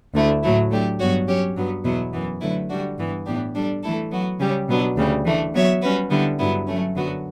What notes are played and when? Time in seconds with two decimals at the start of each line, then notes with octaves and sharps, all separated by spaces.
0.14 D2 D3 A3 E4
0.42 A2 F#3 A3 E4
0.70 F#3 A3 D4 G4
0.99 G2 F#3 B3 F#4 C#5
1.27 F#3 C#4 G4 C#5
1.56 G2 F#3 B3
1.84 E2 B2 F#3 B3 E4
2.13 F#2 E3 B3
2.41 D3 F#3 A3 E4 B4
2.69 D3 G3 D4 F#4
2.98 G2 E3 B3
3.26 A2 E3 B3 D4 G4
3.55 G3 D4 A4
3.83 E3 A3 E4 A4
4.11 F#3 B3 F#4
4.39 C#3 G3 C#4 G4
4.68 B2 F#3 B3 D4
4.97 D2 C#3 G3
5.25 E3 A3 D4
5.54 F#3 B3 F#4 C#5 E5
5.82 G3 C#4 F#4 B4
6.10 D3 G3 B3 E4
6.38 G2 D3 F#3 B3 E4
6.66 F#3 A3 C#4
6.95 F#2 D3 F#3 B3 F#4